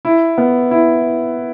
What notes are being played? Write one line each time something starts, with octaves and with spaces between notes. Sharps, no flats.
E4
B3
E4